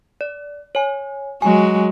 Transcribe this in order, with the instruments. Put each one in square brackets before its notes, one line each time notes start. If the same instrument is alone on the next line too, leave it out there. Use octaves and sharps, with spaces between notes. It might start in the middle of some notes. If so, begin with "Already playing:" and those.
[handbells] D5
C#5 G#5
[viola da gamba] F#3 G#3 F#4 [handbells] G#5